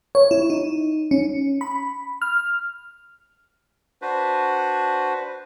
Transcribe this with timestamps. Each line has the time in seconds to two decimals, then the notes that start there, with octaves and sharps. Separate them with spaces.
0.15 C#5
0.31 E4
0.50 D#4
1.11 C#4
1.61 B5
2.22 F6
4.02 D4 F#4 B4 C5